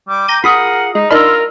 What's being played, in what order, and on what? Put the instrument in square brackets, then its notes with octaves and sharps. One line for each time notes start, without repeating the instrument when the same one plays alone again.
[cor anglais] G3 [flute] D6
[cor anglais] G5 [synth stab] A#5 G6 D#7
[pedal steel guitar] F4 G#4 D#6 [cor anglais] A#4 [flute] F#5 [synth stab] B5
[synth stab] G#3 [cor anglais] D#4
[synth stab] D4 D#4 [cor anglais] F4 [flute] A#4 [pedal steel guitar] B5 C6 E6